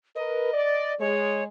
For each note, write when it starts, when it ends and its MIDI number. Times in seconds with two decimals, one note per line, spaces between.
0.16 0.52 70
0.16 0.52 71
0.16 0.95 75
0.53 0.92 74
0.99 1.48 56
0.99 1.44 73